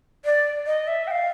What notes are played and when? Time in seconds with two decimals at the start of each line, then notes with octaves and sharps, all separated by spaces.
0.25 D5
0.66 D#5
0.87 E5
1.07 G5
1.11 F5